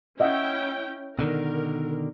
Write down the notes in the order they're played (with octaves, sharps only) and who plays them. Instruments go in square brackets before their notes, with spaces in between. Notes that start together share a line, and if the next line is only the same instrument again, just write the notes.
[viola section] C#4 E4 G5 [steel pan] D#5 E5 F#5
[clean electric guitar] B2 D3 D#3 [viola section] A#4